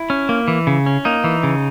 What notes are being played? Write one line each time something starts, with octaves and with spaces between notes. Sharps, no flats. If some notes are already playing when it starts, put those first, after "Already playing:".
Already playing: E4
C#4
A#3
E3
C#3
C#4
A#3 D#4
E3
C#3